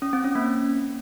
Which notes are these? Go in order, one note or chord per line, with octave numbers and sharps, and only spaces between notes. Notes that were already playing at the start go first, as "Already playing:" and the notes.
C#4
C4
C#4
A#3